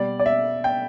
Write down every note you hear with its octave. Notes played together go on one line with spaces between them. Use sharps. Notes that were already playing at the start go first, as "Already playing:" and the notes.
Already playing: B2 G3 D5
D5
E5
G5